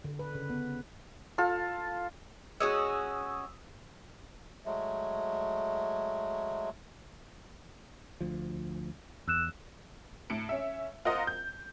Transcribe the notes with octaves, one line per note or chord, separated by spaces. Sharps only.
D3
B4
C#3
B3
F4 A4
G#3 C#4 F#4 D#6 E6
F#3 G#3 A3
D2 F3
E2 E6 F#6 E7
A2 C#7 D7
C#4 E5
F4 A#4 C5 D#5 F#5
G6